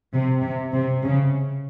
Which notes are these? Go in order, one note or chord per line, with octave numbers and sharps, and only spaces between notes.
C3
C3
C3
C#3